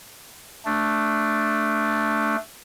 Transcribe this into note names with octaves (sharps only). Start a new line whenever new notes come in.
A3 D4